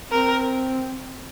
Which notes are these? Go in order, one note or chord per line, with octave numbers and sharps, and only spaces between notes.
C4 A#4